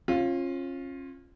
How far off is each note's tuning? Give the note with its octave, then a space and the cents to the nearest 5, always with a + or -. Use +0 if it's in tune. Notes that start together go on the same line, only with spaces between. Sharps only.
C#4 -35 F4 +0